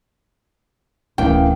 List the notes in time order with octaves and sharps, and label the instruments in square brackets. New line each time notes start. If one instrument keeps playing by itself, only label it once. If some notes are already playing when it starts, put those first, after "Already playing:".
[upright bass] D1 [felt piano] C#3 E3 A#3 [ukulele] G5